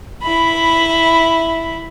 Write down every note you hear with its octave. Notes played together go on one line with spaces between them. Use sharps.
E4 B5